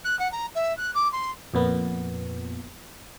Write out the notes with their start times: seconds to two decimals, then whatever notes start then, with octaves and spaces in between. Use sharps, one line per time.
0.05 F#6
0.19 F#5
0.32 A#5
0.55 E5
0.77 F#6
0.94 D6
1.12 C6
1.54 F2 A#2 B3